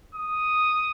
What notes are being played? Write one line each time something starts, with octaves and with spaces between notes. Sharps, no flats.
D#6